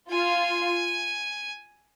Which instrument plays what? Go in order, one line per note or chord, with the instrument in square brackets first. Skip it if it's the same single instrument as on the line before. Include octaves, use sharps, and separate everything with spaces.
[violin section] F4 [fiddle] G#5